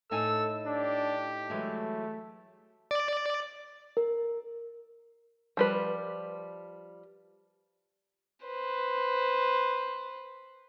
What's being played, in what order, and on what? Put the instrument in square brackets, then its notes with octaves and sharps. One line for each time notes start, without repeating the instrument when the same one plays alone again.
[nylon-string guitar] A2 D#4 G#5 [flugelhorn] A4 [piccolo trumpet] E6
[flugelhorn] D4 [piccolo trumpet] G4
[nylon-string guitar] E3 F#3 G#3 [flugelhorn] A3
[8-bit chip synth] D5
[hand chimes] A#4
[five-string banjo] F3 G3 B4
[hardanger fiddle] B4 C5